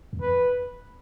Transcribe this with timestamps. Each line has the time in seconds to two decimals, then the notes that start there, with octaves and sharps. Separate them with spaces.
0.13 E2
0.21 F2 B4